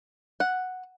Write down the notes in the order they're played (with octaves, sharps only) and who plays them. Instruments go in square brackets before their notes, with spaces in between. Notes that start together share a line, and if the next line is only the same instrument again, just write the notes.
[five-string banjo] F#5